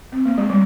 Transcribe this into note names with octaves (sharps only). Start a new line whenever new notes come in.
C4
A#3
G#3
G3